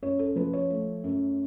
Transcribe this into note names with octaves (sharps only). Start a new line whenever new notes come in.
F#2 C#5
A4
F3 B4
C#5
A3
F#2